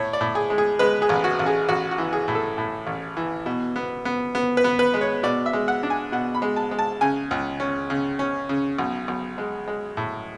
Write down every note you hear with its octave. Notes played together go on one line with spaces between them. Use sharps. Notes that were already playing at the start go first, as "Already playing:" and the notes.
Already playing: A2 C#5
D5
A2
G#4
G#3
G#4
G#3 B4
G#4
A1
F#4
A1
G#4
A1 F#4
F#4
E3
G#4
A2
A4
A2
A1
E3
B2
B3
B3
B3
B4
B3
B4
G#3
C#5
B2 D5
E5
G#3
F#5
D4
G#5
B2 F#5
B5
G#3
A5
G#3
A5
C#3 G#5
C#2
C#4
C#3
C#4
C#3
B1
B1
G#3
G#3
A2